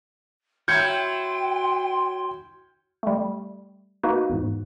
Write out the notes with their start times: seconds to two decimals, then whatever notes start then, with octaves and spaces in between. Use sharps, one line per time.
0.68 F#3 E4 G5 C6 G6 G#6 C#7
3.03 G3 A3
4.03 A#3 D#4 F#4 B4
4.30 E2 G#2